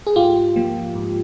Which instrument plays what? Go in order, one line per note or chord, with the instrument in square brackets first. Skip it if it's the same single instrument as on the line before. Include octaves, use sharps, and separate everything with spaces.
[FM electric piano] G#4
G#2 F4 G4
F3 A#3
G#2